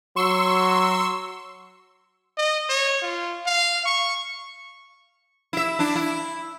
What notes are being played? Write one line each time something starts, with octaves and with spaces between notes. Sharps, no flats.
F#3 C6 C#6 E6
D#5
C#5
F4
F5
C#6
E4 E5
D4 E4
E4